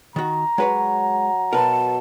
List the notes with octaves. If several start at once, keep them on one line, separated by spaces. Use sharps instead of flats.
D#3 F#4 A#5
F#3 G#3 B4 C#5
B2 A#4 B4 A5